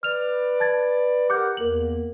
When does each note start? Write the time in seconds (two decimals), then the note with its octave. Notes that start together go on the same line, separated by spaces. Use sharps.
0.03 B4 D5 F6 F7
0.60 A5 G#6 A6
1.30 G4 A#4 F#5 D6 G6
1.57 E2 A#3 A#4 F#7